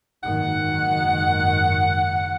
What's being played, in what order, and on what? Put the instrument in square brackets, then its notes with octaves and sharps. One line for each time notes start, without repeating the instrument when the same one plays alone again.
[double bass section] F#1 G#2 D#3 [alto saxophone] F#5